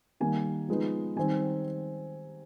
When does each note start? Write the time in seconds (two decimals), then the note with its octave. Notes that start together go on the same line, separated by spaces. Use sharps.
0.20 D#3 G3 A#3 G#5
0.69 F3 G#3 B3 D#4
1.16 D#3 G3 C4 D#4 G#5